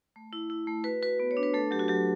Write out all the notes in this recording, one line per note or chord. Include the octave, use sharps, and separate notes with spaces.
A3
E4
E4
A3
F#4 B4
F#4 B4
B3
C#5
D4
B4
A3 A4
F#3 G4
F#4
F#3 G4